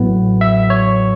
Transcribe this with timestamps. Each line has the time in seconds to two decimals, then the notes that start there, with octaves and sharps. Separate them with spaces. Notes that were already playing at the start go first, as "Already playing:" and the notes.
Already playing: A1 A2 F#3 B3
0.41 E5
0.70 C#5